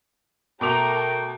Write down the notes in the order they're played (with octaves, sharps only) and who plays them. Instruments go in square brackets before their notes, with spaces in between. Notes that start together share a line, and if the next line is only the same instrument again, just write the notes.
[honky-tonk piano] B2 D6 F7 [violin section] A3 A#4 [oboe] G5